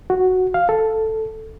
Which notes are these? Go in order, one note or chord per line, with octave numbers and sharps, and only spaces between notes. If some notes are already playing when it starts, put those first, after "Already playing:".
F#4
F5
A4